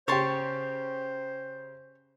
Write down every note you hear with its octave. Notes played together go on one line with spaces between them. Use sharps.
C#3 G4 C5 C#5 A5 C6